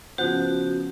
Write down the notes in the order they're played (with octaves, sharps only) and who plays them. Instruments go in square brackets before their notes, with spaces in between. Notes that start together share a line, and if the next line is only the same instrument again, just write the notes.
[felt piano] C#3 F3 B3 [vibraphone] F#4 [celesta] C5 F#5 G6